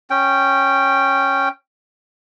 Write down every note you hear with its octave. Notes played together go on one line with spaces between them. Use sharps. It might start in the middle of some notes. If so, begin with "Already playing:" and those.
C#4 G5